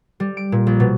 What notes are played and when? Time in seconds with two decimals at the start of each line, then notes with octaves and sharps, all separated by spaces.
0.20 G3
0.37 D7
0.52 A#2
0.67 A#1
0.80 B2